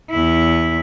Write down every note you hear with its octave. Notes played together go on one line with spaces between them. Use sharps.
E2 E4